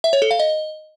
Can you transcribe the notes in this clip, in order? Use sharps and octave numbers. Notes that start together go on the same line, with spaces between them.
E5
C#5
A4
F5
D#5